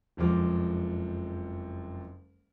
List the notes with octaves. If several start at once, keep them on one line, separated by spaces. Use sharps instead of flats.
F#1 F2 F3 G#3 D6 F6